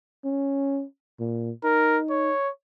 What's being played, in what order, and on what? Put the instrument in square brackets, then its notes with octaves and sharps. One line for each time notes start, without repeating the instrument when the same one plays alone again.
[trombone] C#4
A#2
[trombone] D#4 [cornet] A#4
[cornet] C#5